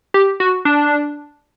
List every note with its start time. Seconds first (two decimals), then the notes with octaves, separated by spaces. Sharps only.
0.14 G4
0.40 F#4
0.65 D4